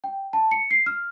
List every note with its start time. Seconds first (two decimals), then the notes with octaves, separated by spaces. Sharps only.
0.04 G5
0.33 A5
0.51 C#7
0.71 C7
0.86 F6